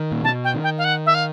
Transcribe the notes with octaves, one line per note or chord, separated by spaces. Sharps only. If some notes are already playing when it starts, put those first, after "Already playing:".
Already playing: D#3
A#2
B2 A5
G5
D#3
G5
F5
F#5
E5
F5